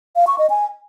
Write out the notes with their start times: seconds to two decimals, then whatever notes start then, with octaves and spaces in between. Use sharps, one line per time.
0.16 F5
0.27 C#6
0.38 D#5
0.50 G#5